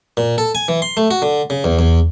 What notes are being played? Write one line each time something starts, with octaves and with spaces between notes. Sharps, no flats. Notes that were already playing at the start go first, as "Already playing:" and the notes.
A#2
A4
G#5
E3
C6
A3
F#4
D3
C#3
E2
E2